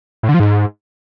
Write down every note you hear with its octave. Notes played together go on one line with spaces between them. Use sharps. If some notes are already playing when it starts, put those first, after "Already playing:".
A2
D3
F3
G#2